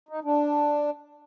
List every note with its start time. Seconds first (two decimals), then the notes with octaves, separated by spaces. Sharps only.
0.09 D#4
0.24 D4